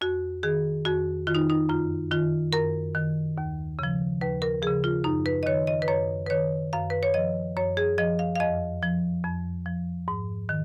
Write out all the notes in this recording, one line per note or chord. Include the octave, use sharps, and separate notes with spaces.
F2 F#4
D#3 G#4
F2 F#4
D#3 F4
D#4
D#4
F#2 F4
D#3 F4
F#2 A#4
D#3
D#2
C#3 F3
D#2 B4
A#4
C#3 F3 G#4
F4
F#2 D#4
B4
D#5
D#3 C#5
D#5
B4
F#2 C#5
B4
D#3 C#5
F#2 F5
B4
C#5
F3 D#5
F#2 C#5
G#4
F3 D#5
F5
F5
F2 D#5
F3
F2
F3
G#2
D#3